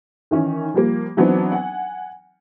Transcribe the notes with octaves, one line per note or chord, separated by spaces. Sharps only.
D#3 E3 C#4 D#4
F3 G3 A#3
E3 F#3 B3 C4 D4 D#4
F#5 G#5